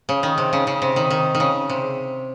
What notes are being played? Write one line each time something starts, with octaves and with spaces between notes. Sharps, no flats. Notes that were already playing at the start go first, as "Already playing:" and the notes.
C#3
D#3
C3
C#3
C#3
C3
D#3
D#3
D#3
C#3
C3